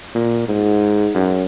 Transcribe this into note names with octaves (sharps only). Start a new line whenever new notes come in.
A#2
G#2
F#2